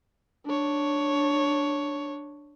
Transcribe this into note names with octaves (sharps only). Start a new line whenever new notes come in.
D4 C#5